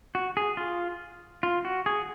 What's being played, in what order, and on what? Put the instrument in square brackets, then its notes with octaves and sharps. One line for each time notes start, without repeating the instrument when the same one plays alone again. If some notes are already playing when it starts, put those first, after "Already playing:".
[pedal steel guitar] F#4
G#4
F4
F4
F#4
G#4